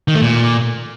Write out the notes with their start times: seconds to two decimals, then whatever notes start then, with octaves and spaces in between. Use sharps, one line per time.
0.08 D#3
0.15 A3
0.22 A#2